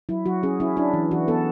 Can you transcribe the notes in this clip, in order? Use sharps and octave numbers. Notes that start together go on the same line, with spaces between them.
F#3 E4
F#3 F#4
C#4 G#4
C#4 E4
D4 E4
E3
E3 F#4
B3 A4